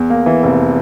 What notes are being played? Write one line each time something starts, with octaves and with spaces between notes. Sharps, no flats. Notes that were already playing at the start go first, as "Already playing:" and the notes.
Already playing: E2
A#3
E3
F1